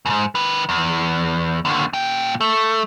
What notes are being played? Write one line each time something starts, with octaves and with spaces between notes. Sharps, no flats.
E2 G#2
D#3 B4
E2
D#2 D3
A#2 G5
A3